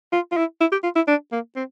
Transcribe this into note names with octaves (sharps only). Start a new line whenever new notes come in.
F4
F4
E4
E4
G4
F4
E4
D4
A#3
C4